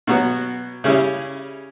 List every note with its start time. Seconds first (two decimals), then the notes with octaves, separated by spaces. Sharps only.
0.07 B2 F#3 B3 F#4
0.84 C#3 G3 C#4 E4